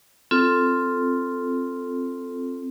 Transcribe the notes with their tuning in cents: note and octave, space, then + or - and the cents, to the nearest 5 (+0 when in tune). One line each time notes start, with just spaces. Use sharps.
C4 +0 F4 +0 A4 +0